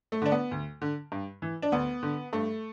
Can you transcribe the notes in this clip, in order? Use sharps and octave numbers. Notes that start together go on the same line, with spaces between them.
A3
D3 D4
B3
D2
D3
G2
E3
D4
D2 B3
D3
G2 A3